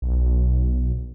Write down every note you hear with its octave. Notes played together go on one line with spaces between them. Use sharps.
B1